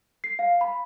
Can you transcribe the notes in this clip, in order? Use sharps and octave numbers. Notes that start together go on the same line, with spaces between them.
C7
F5
B5